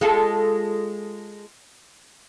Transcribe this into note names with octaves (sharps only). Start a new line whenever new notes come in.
G#3 F4 A4